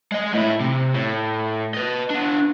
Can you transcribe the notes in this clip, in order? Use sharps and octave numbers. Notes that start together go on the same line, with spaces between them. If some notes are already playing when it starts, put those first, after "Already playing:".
G#3 D#5
A2 E4
C3
A2
B4 D#5
B3 D4